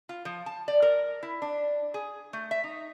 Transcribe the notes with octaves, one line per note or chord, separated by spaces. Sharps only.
F4
F3
A5
D5
A#4
E4
D4
G#4
A3
E5
D#4